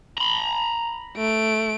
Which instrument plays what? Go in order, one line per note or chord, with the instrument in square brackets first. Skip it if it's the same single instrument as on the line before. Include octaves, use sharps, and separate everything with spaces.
[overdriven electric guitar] A#5 B5
[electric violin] A3 D7